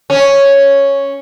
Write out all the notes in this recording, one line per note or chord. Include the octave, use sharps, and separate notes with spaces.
C#4